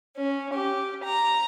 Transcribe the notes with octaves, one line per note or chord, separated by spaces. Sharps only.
C#4
G4
A#5